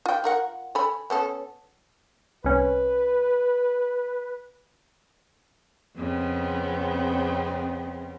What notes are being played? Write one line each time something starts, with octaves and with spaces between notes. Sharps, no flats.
F4 G5
F4 A#4 F#5
A4 G#5 B5
B3 C#4 A4
C2 C#4 B4
F2 C#3 B3 C4